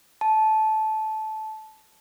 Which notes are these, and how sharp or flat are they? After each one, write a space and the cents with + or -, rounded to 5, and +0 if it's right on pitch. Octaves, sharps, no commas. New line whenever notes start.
A5 -15